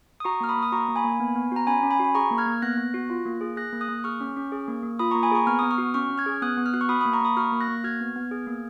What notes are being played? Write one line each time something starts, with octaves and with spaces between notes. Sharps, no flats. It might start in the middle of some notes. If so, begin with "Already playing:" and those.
D#6
F#4 A#5 C#6
A#3 F6
B5 D#6
A#3
D#6
F#4 A#5 C#6
A#3
G#5 B5
A#3
B3
B3
F#4 A#5
C#4 G#5 B5
C#4
G#5 B5
F#4
B5
G#4 A#5 C#6
A#3
F6 G#6
A#3
B3 F#6 A#6
B3
F#4
F4
A#3
G#4
G#4 F#6 A#6
A#3
D#6 F#6
A#3
G#4 C#6 F6
C#4
C#4
G#4
A#3
A#3
F4 B5 D#6
A#3 A#5 C#6
G#5 B5
G#4 A#5 C#6
B3 C#6 F6
B3 D#6
C#6 F6
F#4
C#4 C#6 F6
C#4
F6 G#6
G#4
B3 D#6 F#6
B3
F6
F#4 F#6
C#6 F6
F#4 B5 D#6
A#3 B5 D#6
A#5 C#6
A#3 B5 D#6
F#4 C#6 F6
A#3
F#6 A#6
A#3
F#4 F6 G#6
B3
B3
G#4
A#3